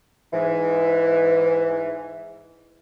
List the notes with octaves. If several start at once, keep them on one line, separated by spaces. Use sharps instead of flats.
G#2 E3